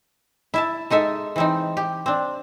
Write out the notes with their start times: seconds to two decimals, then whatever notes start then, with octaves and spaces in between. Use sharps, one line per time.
0.54 E4 E5 A5
0.90 G#3 D#4 A4 E5
1.36 E3 C4 D#4
1.77 G4
2.06 C4 D4